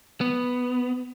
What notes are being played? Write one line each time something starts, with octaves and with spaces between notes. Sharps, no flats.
B3